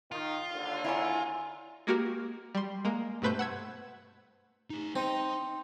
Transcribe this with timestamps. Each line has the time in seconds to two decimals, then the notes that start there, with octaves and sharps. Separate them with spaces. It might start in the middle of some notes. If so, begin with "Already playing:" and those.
0.12 D#3 F4
0.53 D#2 D3
0.84 E4 A#4 C#5 G#5 E6
1.87 G#3 A#3 F#4 G4 A#4
2.55 G3 C6
2.85 G#3 A#3
3.22 G2 B2 A3 B4 C5 G6
3.39 F#5 E6 G#6
4.70 A3 D#4
4.96 C4 D#4 D#5